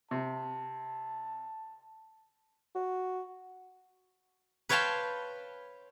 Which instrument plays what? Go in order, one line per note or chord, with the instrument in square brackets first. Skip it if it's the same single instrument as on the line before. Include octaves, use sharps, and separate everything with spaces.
[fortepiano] C3 [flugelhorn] A5
[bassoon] F#4
[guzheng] B4 C#5 F5 G5 A5 C6